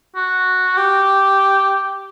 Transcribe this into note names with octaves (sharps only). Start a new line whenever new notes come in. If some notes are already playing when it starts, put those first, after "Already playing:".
F#4
G4